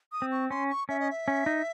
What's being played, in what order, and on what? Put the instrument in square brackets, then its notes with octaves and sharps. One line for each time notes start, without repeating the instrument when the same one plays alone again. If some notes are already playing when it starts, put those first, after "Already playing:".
[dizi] D#6
[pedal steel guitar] C4
[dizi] C#6
[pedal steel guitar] C#4 [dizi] C6
[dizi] C#6
[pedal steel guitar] C#4 [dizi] E5
[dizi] D#5
E5
[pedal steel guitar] C#4
D#4